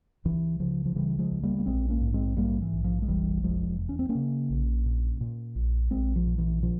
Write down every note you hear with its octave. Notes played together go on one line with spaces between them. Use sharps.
C#2 E3
C#3 F3
F3
C#3 E3 G3
F3 G#3
C#2
G3 A#3
A#3
A#1 G#3 C4
A#3 C#4
G#2
G#3 C4
G#2 G3 A#3
E3
A#1
F3
G#3
F1 E3 G3
F1 F3 G#3
E2
C#4
C4
A#3 C#4
C#3
A#1
A#2
A#2
A#1
A#1 G#3 C4
F3
A#2
E3
A#2 F3